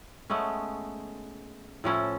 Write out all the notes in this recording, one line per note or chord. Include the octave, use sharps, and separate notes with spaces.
G#3 A3 B3 C#4
A2 F3 C#4 E4